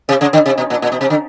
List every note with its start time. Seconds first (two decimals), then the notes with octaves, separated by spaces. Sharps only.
0.09 C3
0.21 C#3
0.33 D3
0.46 C3
0.58 B2
0.70 A#2
0.82 A#2
0.92 B2
1.01 C3
1.10 D3